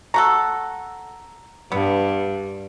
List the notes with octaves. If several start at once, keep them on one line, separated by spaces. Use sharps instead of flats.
A3 F#4 A4 A#5
G2 B3